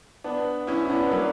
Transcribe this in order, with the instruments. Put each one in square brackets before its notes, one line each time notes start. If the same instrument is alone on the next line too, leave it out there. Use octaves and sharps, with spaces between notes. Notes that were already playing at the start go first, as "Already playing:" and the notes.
[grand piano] B3 D4
C#4 E4
E4
B3 D4
F#3 A#3